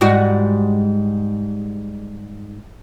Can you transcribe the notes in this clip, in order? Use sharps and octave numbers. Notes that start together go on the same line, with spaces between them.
G#2 G3 F#4